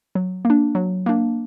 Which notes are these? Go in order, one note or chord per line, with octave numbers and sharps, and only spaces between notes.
F#3
A#3
D4
F#3
A#3 D4